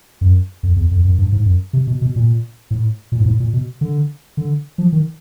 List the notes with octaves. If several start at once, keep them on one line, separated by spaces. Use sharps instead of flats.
F#2
F2
E2
F2
F#2
G2
G#2
F#2
C3
B2
B2
A#2
A2
A#2
G#2
A2
A#2
B2
D3
D3
F3
D#3